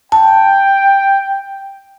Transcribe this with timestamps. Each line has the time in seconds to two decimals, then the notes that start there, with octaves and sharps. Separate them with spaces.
0.12 G5 A5